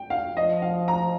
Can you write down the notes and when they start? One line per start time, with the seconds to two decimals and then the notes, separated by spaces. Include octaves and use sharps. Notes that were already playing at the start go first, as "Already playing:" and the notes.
Already playing: G5
0.10 F5
0.36 F3 D#5
0.62 F5
0.88 A#5